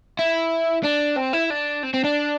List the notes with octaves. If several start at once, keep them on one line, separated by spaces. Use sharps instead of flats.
E4
D4
C4
E4
D4
C4
C4
D4